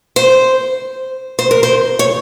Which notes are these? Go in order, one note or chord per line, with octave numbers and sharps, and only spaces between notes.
C5
C5
A#4
C5
C#5